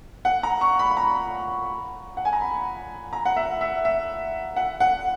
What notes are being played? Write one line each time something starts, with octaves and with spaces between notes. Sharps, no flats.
F#5
A#5
C#6
B5
B5
A#5
F#5
G#5
A#5
B5
A#5
F#5
E5
E5
E5
F#5
F#5